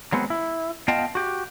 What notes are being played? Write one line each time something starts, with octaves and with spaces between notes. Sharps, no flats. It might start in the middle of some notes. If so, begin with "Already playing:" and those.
F#3 G#3 B3 C4
E4
B3 F4 D#5 F5 G5 A5
F#4 G4